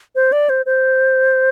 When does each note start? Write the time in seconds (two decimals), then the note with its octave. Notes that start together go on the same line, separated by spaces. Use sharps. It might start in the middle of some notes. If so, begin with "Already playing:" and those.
0.15 C5
0.32 D5
0.49 C5
0.66 C5